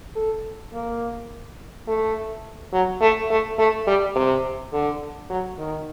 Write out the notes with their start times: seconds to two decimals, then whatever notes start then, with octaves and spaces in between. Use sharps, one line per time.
0.16 A4
0.73 A#3
1.87 A3
2.73 F#3
3.01 A3
3.30 A3
3.59 A3
3.87 G3
4.16 C3
4.72 D3
5.30 F#3
5.58 D#3